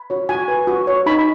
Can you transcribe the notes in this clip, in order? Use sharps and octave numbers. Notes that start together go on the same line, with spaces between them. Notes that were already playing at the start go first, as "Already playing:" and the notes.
Already playing: B5
F#4 C#5
F#4 G#5
B4
F#4
C#5
D#4 B5